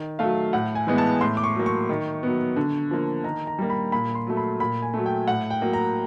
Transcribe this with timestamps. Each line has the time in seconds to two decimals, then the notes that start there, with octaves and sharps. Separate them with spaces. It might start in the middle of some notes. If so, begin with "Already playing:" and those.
Already playing: D#3
0.19 F#3 A3 F5
0.53 A2 F#5
0.75 G#5
0.87 E3 G#3 B3
0.98 A5
1.21 A2 C6
1.37 D6
1.44 C#6
1.55 F#3 A#3
1.66 C#6
1.89 D#3
2.23 F#3 B3
2.56 D3
2.91 F3 A#3
3.24 D#3 A#5
3.47 A#5
3.59 G3 A#3
3.70 B5
3.92 A#2 B5
4.15 C6
4.27 F#3 A3
4.37 B5
4.60 A#2 B5
4.82 G#5
4.94 F#3 A3
5.06 G5
5.28 A2 F#5
5.50 G5
5.62 F#3 A#3
5.73 A#5